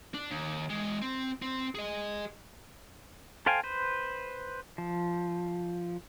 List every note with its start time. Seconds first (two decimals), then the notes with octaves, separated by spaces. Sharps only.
0.14 D4
0.30 D#2
0.70 E3 G#3
1.02 C4
1.42 C4
1.75 G#4 D#5
3.46 A4 C5 F5 G5 G#5
3.63 B4 C5
4.78 F3